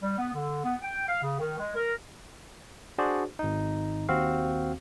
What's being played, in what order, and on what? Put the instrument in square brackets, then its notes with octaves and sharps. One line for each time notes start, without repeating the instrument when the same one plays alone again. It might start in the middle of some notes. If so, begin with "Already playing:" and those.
[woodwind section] G3
B3
D3
B3
G5
F5
C#3
D#3
G#3
A#4
[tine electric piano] D4 F#4 G#4 C5 D5
G#1 D#4
D#2 C4 F#4 F5